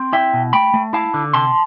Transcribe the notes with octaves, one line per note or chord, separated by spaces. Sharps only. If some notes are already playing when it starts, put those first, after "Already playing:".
Already playing: C4
E4 E5 G5
B2
A3 G5 B5
A3
E4 F5 A5
D3
C3 A5 C6